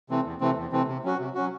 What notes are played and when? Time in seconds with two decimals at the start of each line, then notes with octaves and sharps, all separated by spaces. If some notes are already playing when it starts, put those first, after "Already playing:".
0.10 C3 E3 A3 C4
0.25 E2
0.41 C3 E3 A3 C4
0.57 E2
0.72 C3 E3 A3 C4
0.88 C3
1.04 F#3 C#4 F#4
1.19 C3
1.35 F#3 C#4 F#4